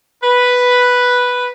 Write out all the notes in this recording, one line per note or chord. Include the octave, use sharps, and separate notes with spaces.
B4